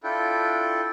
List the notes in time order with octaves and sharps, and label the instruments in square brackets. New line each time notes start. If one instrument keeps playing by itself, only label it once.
[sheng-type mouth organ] D4 E4 F4 A4 G5